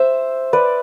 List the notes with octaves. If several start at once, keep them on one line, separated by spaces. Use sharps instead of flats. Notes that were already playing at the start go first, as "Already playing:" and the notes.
Already playing: C5 E5
B4 D5